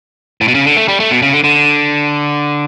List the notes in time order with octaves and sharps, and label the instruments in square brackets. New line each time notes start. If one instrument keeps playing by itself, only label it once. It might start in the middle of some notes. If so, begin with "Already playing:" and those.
[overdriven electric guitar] A2
B2
C#3
D3
A3
G3
A3
B2
C#3
D3
D3